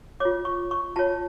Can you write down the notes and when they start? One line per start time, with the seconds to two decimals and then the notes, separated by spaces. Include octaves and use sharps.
0.20 F4 C#5 D6
0.45 C#6
0.71 C#6
0.96 F4 C#5 A5